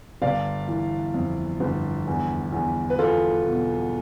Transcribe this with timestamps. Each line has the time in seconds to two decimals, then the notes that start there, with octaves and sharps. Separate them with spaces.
0.22 G1 D5 F5
0.68 E3
1.14 F2
1.60 G1
2.07 E2
2.52 E2
2.90 B4
2.99 E2 F4 A4
3.46 B2